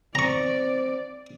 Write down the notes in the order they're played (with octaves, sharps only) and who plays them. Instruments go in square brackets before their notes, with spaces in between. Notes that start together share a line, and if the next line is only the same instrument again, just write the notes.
[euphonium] C4 [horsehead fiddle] D5 [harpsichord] A#5 C#6